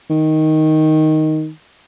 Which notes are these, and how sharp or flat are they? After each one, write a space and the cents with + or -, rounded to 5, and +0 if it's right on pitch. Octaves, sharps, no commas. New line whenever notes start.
D#3 +5